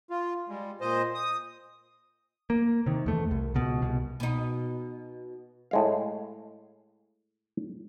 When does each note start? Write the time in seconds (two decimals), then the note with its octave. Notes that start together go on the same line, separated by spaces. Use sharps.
0.10 F4
0.49 G3 G#3
0.81 A#2 C5 D#5
1.15 D#6
2.50 A#3
2.86 C3 D#3
3.06 E2 A3
3.31 C2
3.54 C#2 B2
3.82 C2 B2
4.20 B2 D#4
5.71 A2 G#3 F5